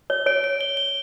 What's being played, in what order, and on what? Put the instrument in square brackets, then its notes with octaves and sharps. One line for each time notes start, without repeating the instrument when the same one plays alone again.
[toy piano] C#5 [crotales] G7
[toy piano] C#5 [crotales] D7
[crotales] D7
G7
G7